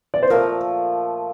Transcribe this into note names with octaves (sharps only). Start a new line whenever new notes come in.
D5
C5
A#2 F3 A3 A#4